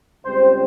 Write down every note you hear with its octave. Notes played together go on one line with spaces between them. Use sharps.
C#2 C#3 G3 C4 C5